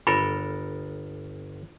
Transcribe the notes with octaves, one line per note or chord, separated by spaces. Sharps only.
G1 A4 A#4 B5